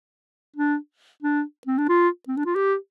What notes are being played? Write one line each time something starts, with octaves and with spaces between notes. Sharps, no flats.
D4
D4
C4
D4
F4
C4
D4
F4
G4